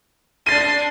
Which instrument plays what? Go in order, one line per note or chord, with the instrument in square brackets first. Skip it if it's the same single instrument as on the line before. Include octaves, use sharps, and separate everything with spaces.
[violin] D4 C6 [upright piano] A6 D#7